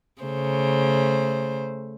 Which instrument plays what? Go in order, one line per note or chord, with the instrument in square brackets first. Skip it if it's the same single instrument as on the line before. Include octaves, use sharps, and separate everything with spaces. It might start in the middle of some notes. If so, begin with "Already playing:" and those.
[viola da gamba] C#3 A3 C5